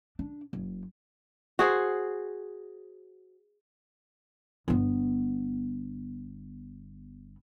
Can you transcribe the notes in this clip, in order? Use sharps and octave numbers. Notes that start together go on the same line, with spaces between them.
D4
F#1
F#4 G#4 C5
G1 B3